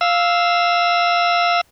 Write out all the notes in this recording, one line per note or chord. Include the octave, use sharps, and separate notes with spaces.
F5 E6